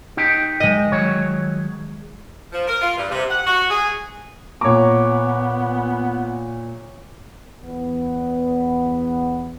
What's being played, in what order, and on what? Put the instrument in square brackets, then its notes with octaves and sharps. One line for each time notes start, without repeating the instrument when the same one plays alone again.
[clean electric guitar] D#4 G4 G5
[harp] G#3 D#5
[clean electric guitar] D#3 F#3 C#5
[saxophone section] F3
A#4
F4
G2
C3
F#5
F#4
G#4
[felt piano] A#2 A#5 [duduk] B3 [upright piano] C#5 D6
[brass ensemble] E2 B3